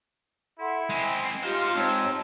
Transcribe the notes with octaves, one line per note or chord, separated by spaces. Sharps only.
E4 A4 F#5 C6
G#3 C4 G5 G#5
D#4 F4 G4 C5 F5
G#2 C4 C#5 D#5 A5